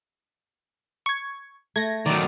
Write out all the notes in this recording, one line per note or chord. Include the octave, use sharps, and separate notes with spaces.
C#6 G#6
A3 G#6 A#6
D#3 F#3 D5